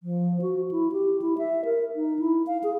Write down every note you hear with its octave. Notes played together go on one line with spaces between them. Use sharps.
F3
F#4
E4
G4
E4
E5
A#4
D#4
E4
F5
G#4